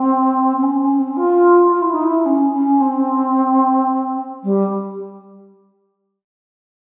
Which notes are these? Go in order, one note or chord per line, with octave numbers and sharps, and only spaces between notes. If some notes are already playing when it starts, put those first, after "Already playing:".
Already playing: C4
C4
C#4
C#4
C4
F4
F4
E4
D#4
E4
C#4
C#4
C4
G3